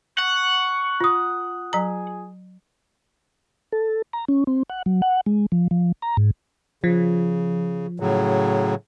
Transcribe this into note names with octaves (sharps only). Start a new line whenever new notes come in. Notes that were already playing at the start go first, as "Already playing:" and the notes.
F#5 C#6
F4 D#6
F#3 G#4 A#5
A4
A#5
C#4
C4
F#5
F#3
F#5
G#3
F3
F3
A#5
G#2
C#3 F3
A2 C#3 F#3